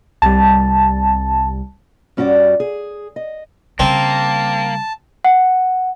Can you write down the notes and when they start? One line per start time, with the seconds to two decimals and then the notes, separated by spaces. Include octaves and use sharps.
0.22 C2 G3 A5
2.17 G2 C#4 F#4 G4 D5
2.60 G#4
3.16 D#5
3.79 C#3 G3 A#3 C4 A5
5.25 F#5